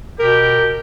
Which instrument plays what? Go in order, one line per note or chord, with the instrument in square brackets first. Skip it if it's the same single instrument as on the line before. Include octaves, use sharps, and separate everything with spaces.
[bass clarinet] B2 [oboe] G4 [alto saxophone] A#4